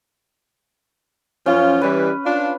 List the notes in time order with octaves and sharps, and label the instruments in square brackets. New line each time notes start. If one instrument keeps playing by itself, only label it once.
[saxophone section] F#2 F3 F4 [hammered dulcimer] C#4
[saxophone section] E3 G3 [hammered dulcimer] B4
[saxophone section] D4 F4